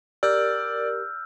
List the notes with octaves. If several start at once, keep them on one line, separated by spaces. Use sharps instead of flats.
G4 A#4 D5 E6 F6 G6